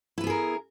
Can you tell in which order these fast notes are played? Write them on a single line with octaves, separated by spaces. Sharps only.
E4 B4 B3 G#4 A#4